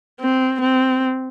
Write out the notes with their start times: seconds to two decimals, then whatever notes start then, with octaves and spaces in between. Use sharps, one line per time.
0.21 C4
0.61 C4